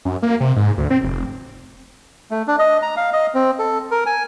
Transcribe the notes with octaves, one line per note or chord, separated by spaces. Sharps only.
F#2
A#3
C3
G#2
D2
C4
F1
A3
D4
D#5
A#5
F5
D#5
C4
A4
A#4
G#5